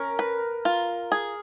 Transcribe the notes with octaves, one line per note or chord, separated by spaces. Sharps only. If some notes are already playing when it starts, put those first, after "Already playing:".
Already playing: C#4 A#4
B4
F4
G#4